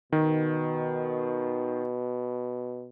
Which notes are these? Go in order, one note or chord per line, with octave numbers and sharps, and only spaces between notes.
B2 D#3